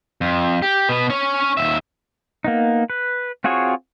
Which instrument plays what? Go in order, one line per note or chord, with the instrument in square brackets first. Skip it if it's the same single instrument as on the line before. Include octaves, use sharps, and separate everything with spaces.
[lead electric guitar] F2
G4
B2 B3
C#4 C#5
D#2 E5
[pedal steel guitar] A#3 B3 D#4
B4
C4 F4 F#4 G#4 C#5